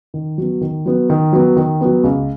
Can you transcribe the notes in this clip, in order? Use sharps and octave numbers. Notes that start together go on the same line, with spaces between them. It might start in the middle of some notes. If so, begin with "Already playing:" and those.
D#3
F#3 B3
D#3
F#3 B3
D#3
F#3 B3
D#3
F#3 B3
C#2